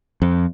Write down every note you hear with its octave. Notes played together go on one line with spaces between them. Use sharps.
F2